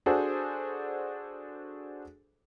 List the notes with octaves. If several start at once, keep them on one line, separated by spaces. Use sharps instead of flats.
D4 F#4 G#4 A4 C5